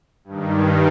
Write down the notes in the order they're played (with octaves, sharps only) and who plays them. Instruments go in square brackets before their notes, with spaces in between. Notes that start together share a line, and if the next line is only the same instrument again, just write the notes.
[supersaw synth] G2 D#3